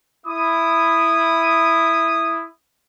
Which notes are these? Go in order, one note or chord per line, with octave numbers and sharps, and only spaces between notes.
E4 D#6